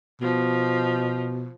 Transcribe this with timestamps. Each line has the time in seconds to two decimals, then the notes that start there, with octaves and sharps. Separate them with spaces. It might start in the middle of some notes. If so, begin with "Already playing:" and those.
0.21 B2 F3